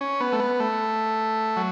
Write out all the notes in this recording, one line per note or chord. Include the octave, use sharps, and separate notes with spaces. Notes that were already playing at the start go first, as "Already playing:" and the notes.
C#4
B3
A3
B3
A3
F#3